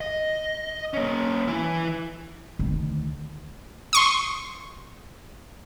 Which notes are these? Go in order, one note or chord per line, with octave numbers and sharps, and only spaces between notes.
D#5
A#3 C#4
E3 E4
D2 D#3
C6 C#6 D#6